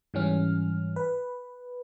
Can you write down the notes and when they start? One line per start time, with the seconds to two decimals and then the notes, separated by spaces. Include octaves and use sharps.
0.14 G#2 E3 G3 C#4 F6
0.96 B4